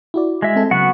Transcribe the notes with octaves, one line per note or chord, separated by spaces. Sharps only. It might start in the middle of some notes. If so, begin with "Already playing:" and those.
E4 F#4 D5
G#3 E5
C4 A4
C#3 F#3 B3 F#4 F#5